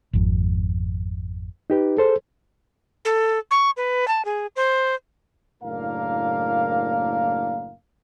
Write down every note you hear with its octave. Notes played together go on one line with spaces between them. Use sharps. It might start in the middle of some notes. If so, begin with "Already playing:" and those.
G#1 F2
D#4 G4 B4
G#4 A4 C5
A4
C#6
B4
A5
G#4
C5
F#1 A2 A#3 D4 A#4 F5